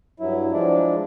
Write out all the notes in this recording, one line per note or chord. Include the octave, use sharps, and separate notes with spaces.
G2 F#3 E4
F3 G#3 D4